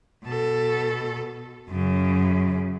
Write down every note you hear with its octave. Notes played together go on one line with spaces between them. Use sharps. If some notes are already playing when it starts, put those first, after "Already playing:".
B2 A4
F#2 C#3